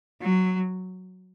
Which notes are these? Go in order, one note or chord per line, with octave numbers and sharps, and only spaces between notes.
F#3